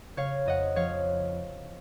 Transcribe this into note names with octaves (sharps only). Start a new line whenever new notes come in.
C#3 C#5 F5
F2 D#5 F#5
F3 C#5 F5